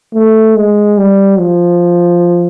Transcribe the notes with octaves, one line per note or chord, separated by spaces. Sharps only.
A3
G#3
G3
F3